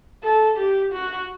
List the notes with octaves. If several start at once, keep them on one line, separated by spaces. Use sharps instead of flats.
A4
G4
F#4